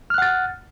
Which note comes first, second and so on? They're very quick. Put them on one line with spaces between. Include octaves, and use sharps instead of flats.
F6 F#6 F#5 A6